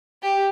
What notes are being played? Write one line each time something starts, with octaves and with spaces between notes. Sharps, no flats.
G4